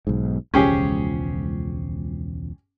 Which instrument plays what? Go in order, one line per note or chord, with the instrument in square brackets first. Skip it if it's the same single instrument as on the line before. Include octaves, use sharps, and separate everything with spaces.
[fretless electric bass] B1 G#2
[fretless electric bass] E1 C#2 F3 [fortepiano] C#4 G4 G#4